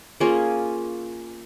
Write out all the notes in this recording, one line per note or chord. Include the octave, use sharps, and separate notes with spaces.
A#3 C#4 F4 G#4